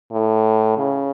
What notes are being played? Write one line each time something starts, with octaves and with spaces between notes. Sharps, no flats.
A2
C#3